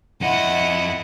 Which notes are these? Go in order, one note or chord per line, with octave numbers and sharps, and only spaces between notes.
F2 E4 D#5 F#5